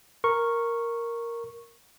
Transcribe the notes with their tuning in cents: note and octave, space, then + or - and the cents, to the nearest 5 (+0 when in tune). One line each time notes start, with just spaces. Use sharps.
A#4 +0 C#6 -10